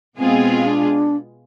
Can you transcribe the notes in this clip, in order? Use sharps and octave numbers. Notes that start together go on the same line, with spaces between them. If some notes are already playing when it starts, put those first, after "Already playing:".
B2 G#3 B3 C4 F4 G#4
D4